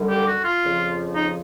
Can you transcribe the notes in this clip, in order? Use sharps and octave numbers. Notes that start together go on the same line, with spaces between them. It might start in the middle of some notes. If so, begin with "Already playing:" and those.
Already playing: F#2 D3 G3
G4
F#4
F4
F2 C#3 F3
D#4